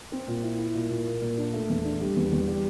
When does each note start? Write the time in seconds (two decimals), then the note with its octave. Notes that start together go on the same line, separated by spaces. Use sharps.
0.12 C4
0.28 A#2
0.43 E4
0.59 E4
0.75 A#2
0.90 A#2
1.06 A#3
1.22 A#2
1.38 D4
1.53 A3
1.70 E2
1.84 D4
2.00 G3
2.16 E2
2.33 E2
2.47 G3